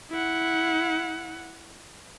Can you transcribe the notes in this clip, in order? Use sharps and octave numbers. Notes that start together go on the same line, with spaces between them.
E4 F#5